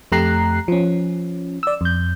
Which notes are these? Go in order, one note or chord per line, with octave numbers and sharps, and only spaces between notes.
F2 A3 G4 A#5 F#6 C7
F3 C#4
D5 E6
F2 G6